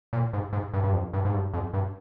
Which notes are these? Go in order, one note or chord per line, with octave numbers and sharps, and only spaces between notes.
A#2
G#2
G#2
G2
G2
F2
G2
G#2
G2
F2
G2